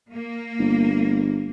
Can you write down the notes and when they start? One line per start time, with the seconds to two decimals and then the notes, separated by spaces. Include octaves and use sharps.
0.11 A#3
0.59 G1